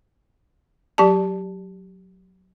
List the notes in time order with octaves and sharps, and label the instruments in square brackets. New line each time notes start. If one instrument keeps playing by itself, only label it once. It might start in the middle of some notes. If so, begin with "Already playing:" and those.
[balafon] F#3 G4 D5 A5